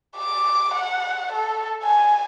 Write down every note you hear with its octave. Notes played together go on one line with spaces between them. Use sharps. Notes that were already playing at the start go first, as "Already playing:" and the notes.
D6
F#5
A4
G#5